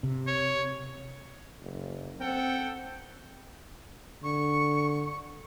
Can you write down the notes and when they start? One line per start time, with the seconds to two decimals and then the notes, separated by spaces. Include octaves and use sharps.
0.03 C3
0.27 C#5
1.62 F#1
2.20 C4 A4 F#5 G5
4.24 D3 C#6